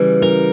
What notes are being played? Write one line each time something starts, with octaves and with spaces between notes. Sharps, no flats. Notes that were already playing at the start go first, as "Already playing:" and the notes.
Already playing: C#3 E3 G3
A#4